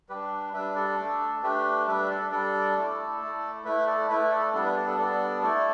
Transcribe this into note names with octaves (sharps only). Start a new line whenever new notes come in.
G3 D4 G4 B4
G3 D4 B4 E5
A4 D5
A3 D4
A3 D4 G4 B4
G3 D4 B4 E5
A4 D5
G3 D4 A4 D5
A3 E4
A3 E4
A3 E4 B4 E5
A4 D5
A3 E4 B4 E5
A4 D5
G3 B3 D4 A4 D5
B4 E5
A4 D5
A4
G3 B3 D4 A4 D5
A3 E4 A4 D5